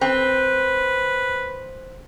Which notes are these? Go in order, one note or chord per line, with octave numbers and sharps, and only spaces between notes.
C4 B4